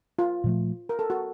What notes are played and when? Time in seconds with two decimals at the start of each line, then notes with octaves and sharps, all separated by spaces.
0.19 F4
0.44 A#2 F3 A3
0.89 A#4
0.99 A4
1.10 F#4